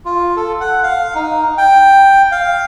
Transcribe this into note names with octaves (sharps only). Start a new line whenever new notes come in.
F4
A4
F#5
F5
D#4
G5
F5